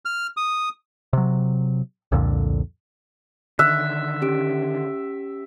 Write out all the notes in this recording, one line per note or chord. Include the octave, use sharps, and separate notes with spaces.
F6
D#6
C3 F#3
C2 F2 A#2 D3
D3 D#3 E5 F#6
C#4 G4 D7